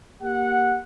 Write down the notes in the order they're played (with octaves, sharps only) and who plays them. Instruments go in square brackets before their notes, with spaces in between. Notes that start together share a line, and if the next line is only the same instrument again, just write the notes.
[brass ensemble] A#3 G4 F#5